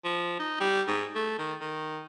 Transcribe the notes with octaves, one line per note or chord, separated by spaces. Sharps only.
F3
D#4
G3
G#2
A3
D#3
D#3